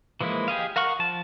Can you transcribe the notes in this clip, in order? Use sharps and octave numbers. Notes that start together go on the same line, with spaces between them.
E3 F3 G#3 A#3 E4
G4 G#4 D#5 F5
A#4 F5 F#5 C#6
F3 A5